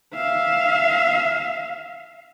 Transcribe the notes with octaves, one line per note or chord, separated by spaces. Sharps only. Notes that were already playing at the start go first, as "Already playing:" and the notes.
E5 F5